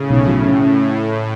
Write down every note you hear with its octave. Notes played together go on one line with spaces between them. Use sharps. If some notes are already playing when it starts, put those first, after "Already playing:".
Already playing: A2 C#3
B1
A2 F#3
C#4
C#4